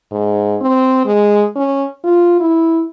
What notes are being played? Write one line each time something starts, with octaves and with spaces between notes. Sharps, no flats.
G#2
C4
G#3
C#4
F4
E4